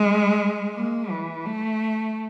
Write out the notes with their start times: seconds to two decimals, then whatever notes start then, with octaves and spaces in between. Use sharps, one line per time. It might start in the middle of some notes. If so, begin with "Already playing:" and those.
Already playing: G#3
0.75 A#3
1.10 E3
1.45 A3